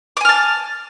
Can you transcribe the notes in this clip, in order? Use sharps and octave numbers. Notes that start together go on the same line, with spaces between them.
G#5 A5 D6 F6